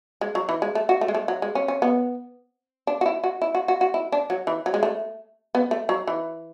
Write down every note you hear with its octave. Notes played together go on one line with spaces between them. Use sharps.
G#3
F#3
E3
G#3
A3
F#4
A3
G#3
A3
F#3
G#3
C#4
C#4
B3
D4
F#4
E4
F#4
E4
F#4
F#4
F#4
E4
D4
F#3
E3
F#3
G#3
A3
B3
A3
F#3
E3